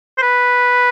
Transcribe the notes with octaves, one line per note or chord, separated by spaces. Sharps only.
C5
B4